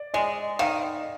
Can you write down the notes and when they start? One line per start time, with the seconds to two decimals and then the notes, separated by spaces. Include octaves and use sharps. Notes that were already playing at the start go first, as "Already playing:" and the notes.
Already playing: D5
0.14 G#3 D#5
0.59 D#3 F5